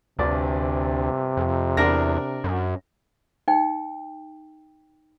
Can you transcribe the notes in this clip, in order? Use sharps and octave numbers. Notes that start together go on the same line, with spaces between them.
G1 D2 C3 D5
F2
E2 D4 A#4 A#6
F#2
D#4 G5